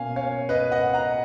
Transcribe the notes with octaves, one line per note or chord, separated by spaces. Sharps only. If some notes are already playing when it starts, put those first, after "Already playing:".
Already playing: B2 A#3 C#4 F5 G#5
C#5 F5
B4 D#5
D#5 F#5
F#5 A#5